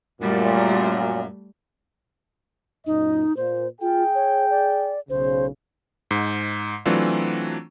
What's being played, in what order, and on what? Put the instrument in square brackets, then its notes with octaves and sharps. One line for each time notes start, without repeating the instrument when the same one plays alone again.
[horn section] F#2 A#2 [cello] G3 A3
[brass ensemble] F#2 A#2 D#5 [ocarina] D#4
[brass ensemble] A#2 [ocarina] C5
[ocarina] F4 [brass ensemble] G#4 G5
[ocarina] C#5
D5
[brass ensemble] B1 C#3 [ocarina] C5
[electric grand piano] G#2
E3 F#3 A3 C4 D4 F4